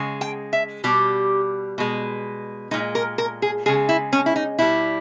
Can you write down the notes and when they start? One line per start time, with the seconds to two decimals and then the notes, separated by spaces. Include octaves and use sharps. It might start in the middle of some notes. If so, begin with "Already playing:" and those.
Already playing: C#3 G#3
0.21 G5
0.53 E5
0.84 B2 G3 G4
1.78 B2 G#3
2.71 A#2 G#3 D#4
2.95 A#4
3.18 A#4
3.42 G#4
3.66 C#3 G#3 G#4
3.89 E4
4.13 C#4
4.26 E4
4.36 D#4
4.59 B2 G3 E4